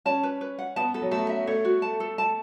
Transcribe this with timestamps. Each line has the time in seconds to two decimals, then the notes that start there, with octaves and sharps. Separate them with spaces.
0.05 C#4 A5
0.23 B4
0.41 B4
0.59 F#5
0.76 B3 A5
0.94 A4
1.02 F#3
1.11 A3 A4
1.29 E5
1.47 A3 C#5
1.65 F#4
1.82 A5
2.00 A4
2.18 A5